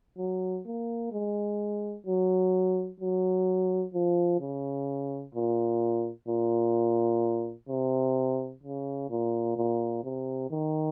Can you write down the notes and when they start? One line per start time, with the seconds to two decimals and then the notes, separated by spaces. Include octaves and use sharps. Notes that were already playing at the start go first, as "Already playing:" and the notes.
0.18 F#3
0.66 A#3
1.12 G#3
2.06 F#3
3.00 F#3
3.94 F3
4.40 C#3
5.35 A#2
6.28 A#2
7.69 C3
8.63 C#3
9.10 A#2
9.57 A#2
10.04 C3
10.50 D#3